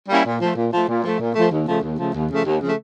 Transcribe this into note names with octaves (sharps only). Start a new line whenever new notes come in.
G3 A#3 C#4 E4
A#2
F3 A3
A#2
F3 A3
A#2
F3 A3
A#2
F3 A3
D#2
C#3 F3 A3
D#2
C#3 F3 A3
D#2
C#3 F3 A3
D#2
C#3 F3 A3